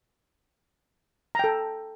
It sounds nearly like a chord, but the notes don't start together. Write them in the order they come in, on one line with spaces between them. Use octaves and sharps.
A#5 G5 A4